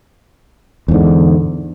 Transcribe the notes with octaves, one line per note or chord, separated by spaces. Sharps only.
E2 G#2 D3